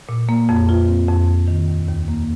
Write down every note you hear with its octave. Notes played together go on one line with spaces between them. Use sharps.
A#2
A#3
F2
F4
C4
F2
F2
D#3
D#2
D#2
A#3